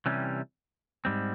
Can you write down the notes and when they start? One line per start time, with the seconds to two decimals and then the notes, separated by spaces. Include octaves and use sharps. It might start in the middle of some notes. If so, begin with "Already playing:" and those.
0.06 C3 E3 G3 C#4
1.05 G#2 G3 C4